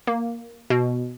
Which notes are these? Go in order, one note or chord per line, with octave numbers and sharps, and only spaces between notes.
A#3
B2